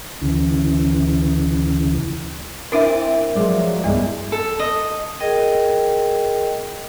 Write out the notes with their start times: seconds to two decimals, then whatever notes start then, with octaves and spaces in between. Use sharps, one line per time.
0.21 D2 C#3 E3
2.72 C4 D4 E4 A#4 E5
3.35 F3 F#3 G#3 D5
3.84 C2 G2 G#3 B3 E4
4.32 A4
4.60 D#5
5.20 G#4 A#4 D#5 G5